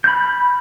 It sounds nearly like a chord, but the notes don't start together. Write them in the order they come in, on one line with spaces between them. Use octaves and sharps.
G6 B5 F6